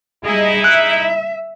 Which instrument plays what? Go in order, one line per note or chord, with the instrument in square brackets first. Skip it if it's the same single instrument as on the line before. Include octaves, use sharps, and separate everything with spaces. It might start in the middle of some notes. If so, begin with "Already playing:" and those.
[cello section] G3 G#4 D#5 [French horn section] D#4 E4
[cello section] E5 [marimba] F#6